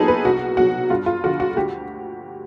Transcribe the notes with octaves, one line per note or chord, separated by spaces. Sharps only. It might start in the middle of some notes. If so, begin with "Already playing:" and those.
Already playing: A#2 F#3 B3 D#4 G#4 A4
B4
C2 F#4
B2 F#3 F#4
G2 F4
F4
D3 F3 F#4
F#4
D2 G4